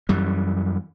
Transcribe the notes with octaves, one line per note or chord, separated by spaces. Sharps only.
F#2 E3 G3